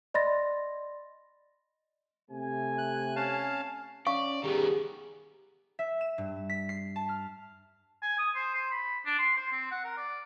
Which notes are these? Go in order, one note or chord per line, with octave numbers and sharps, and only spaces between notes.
D5 D#5 B5 C6 A6 A#6
C3 A3 G#5
F#6
C#4 F5 A5
C#4 D5 F5 C#6
D#3 G3 B3 G4 G#4
E5
E7
G2
B6
C7
A5
F6
G#5
D#6
C5
C5
B5
D4
C6
C5
C4
F#5
A#4
D5